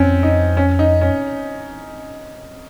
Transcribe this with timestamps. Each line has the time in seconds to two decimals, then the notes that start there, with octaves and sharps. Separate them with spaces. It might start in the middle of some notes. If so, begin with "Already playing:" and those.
Already playing: F2 C4 C#4
0.23 D#4
0.57 C#4
0.79 D#4
1.01 C#4